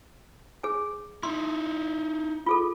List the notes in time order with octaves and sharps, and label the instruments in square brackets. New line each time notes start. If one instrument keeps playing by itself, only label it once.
[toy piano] G#4 C#5 G#5
[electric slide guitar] D#4 E4 [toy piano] C6
[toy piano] F4 G#4 A4